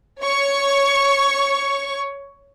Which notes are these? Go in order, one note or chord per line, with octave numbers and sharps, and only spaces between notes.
C#5 C#6